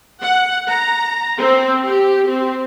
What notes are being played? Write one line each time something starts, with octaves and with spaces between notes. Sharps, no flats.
F#5
A#5
C4
G4
C4